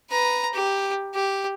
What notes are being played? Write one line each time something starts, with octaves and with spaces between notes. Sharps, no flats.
B4 A#5
G4
G4